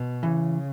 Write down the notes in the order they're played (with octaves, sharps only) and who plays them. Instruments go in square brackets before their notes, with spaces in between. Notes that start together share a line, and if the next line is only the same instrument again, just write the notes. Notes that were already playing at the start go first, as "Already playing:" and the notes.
Already playing: [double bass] B2
[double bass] C#3 [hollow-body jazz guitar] E3